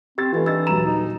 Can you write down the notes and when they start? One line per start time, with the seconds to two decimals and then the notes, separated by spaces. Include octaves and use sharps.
0.18 C4 G4 E6 A6
0.32 E3 A3 D#4 F4
0.46 D4 D#4 E6 A6
0.67 D#1 F#3 A#5 E7
0.86 D#4